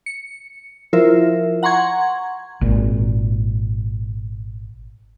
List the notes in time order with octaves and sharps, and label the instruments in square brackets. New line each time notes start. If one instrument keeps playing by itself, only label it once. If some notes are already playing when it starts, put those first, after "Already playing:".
[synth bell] C#7
F3 E4 F4 A#4 C5 E5
F#5 A#5 C6 C#6 G#6
[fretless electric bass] G#1 A#2